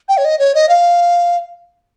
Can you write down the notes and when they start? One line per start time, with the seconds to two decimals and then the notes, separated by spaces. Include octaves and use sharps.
0.09 G5
0.17 C#5
0.25 D#5
0.39 C#5
0.55 D#5
0.69 F5